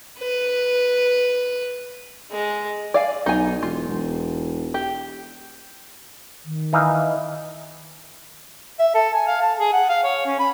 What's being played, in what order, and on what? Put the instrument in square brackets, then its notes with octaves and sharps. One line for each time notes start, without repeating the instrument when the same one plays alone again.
[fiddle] B4
G#3
[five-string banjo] D5 F5 G#5
[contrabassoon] B1 [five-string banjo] D#4 G#5
[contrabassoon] E1 [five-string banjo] F4
[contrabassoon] E1
[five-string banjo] G4
[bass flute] D#3
[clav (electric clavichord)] E3 D#4 F5
[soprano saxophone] E5
A4
G#5
F5
A5
G#4
F#5
F5
C#5
C#4
B5